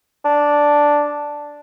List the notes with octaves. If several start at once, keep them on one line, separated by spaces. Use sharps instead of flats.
D4